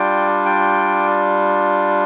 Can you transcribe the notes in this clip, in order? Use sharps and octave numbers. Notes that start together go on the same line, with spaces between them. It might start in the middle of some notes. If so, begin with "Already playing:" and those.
Already playing: G3 D4 F4 G5
G5